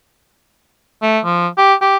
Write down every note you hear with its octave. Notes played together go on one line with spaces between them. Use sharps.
A3
F3
G4
G4